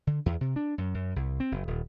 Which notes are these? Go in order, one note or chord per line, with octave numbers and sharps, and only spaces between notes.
D3
E2
C3
D4
F#2
F#2
C2
C4
F#1
D#1